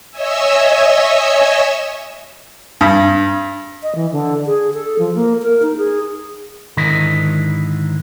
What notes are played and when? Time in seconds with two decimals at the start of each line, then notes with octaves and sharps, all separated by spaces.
0.11 C#5 D#5 E5 G#5 E6
2.81 G2
3.83 D#5
3.95 E3
4.12 D3
4.47 G#4
4.74 A4
4.99 F3
5.15 A#3
5.42 A#4
5.62 D#4
5.77 G#4
6.77 G#2 D3 D#3 E4 D#5